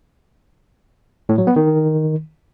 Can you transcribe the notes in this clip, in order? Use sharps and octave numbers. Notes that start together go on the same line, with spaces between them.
A2
F#3
B3
D#3